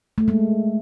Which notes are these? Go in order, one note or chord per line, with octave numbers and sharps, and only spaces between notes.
A3
G#3 A#3